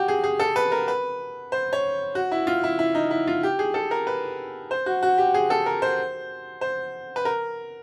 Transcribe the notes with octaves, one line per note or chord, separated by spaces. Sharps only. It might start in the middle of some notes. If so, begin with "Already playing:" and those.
Already playing: F#4 G4
G#4
G#4
A4
B4
A#4
B4
C5
C#5
F#4
E4
F4
E4
E4
D#4
E4
F4
G4
G#4
A4
A#4
B4
C5
F#4
F#4
G4
G#4
A4
A#4
C5
C5
B4
A#4